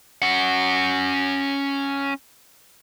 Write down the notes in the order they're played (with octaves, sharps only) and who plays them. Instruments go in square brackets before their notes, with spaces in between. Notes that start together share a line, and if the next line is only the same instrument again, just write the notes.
[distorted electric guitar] C#4 F#5